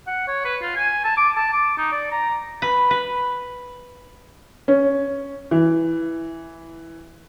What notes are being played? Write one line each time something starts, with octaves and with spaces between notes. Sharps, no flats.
F#5
C#5
B4
F4
G#5
A5
D6
A5
D6
D#4
D5
A#5
B4
B4
C#4
E3